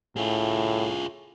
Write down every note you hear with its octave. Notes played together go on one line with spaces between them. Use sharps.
A2 F4 G#4